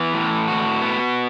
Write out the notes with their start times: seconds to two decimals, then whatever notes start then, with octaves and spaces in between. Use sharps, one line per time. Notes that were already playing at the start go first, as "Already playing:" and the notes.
Already playing: E3 B3
0.14 A2
0.48 F#4
0.82 B3